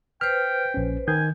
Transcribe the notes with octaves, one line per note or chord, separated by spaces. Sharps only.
B4 C5 G5 F6
A#1 C#4
D#3 G#5 G6